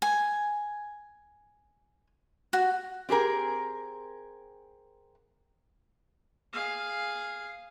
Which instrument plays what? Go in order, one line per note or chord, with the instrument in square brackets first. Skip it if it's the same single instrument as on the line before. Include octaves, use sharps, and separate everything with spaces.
[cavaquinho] G#5
F#4
[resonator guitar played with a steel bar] C4 G4 G#4 A#4
[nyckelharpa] G#4 F5